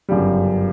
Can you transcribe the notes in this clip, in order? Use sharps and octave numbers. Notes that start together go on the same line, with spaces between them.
G1 F#2 C#3 G3